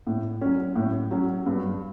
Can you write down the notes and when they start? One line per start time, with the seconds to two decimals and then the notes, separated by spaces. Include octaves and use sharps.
0.07 A2
0.41 F#3 C#4
0.76 A2
1.11 F#3 C#4
1.46 G2